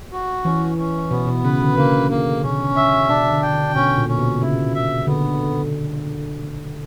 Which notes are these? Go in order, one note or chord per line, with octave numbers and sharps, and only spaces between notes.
F#4
E3 C#4
C#4
B2 B3
B2
C#3 B4
D3
C#3 A#3
A#3
B2 C#4
E5
B2 D4
D3
G5
D3
B2 C#4
A#2
C#4
B2
C#3 E4
E5
D3 B3